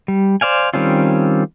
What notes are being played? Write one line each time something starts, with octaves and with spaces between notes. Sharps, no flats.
G3
C5 D5 F5 G#5
D#3 G3 C4 C#4 F4